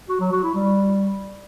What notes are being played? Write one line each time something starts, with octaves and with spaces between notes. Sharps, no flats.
F#4
F#3
F#4
E4
G3